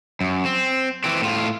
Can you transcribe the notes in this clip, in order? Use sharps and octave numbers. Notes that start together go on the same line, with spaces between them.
F#2
C4
E3 C4
A2 F4